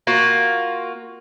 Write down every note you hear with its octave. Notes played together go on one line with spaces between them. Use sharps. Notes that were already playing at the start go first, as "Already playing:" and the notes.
A#3 F4 F#4